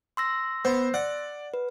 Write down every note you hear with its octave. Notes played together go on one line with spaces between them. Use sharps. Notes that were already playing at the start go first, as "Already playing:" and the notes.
C6 E6 A#6
B3 C5
D5 F#5
B4